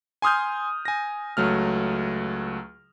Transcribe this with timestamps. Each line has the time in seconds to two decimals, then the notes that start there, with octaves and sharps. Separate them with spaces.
0.22 G#5 C6 D#6 F6 G6
0.85 G#5 A#6
1.37 C#2 F#3 A3 F6